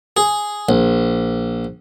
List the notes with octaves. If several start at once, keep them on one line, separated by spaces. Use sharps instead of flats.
G#4
A#1